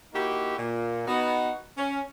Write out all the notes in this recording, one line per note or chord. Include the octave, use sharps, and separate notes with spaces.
A#3 D#4 E4 F#4 G4
A#2
B3 D#4 F#4
C#4